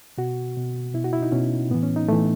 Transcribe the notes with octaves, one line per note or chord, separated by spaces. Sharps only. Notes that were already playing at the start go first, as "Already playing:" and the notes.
B2 F#4
B2
B2 E4
F#4
E4
D#4
B2 C#4
A2 E3 B3
C#4
D#4
A2 E3 A3